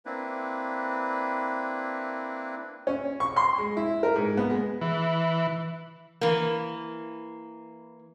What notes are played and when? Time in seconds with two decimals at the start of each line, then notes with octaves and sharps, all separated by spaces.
0.06 A#3 C4 D4 E4 B4
2.87 C#4
3.20 C#6
3.36 C6
3.58 G#3
3.77 E4
4.03 A#4
4.16 G#2
4.37 B3
4.50 G#3
4.81 E3
6.21 E3 A#3